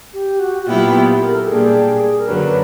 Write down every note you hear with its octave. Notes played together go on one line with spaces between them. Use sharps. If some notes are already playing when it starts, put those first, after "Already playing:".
G4
F#4
F#4
A#2 F#3 B3 E4 F4 G4
G4
A#4
A4
A#2 G3 A#3 D4 G4 G#4
A#4
F#2 D3 F#3 A#3 D4 B4